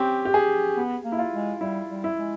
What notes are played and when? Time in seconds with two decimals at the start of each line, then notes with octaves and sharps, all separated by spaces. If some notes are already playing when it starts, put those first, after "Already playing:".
Already playing: C4 C#4 G4
0.25 G4
0.34 G#4
0.77 B3
1.04 A#3
1.12 E4
1.19 F4
1.33 G#3
1.61 G3 E4
1.90 G3
2.04 E4
2.18 G#3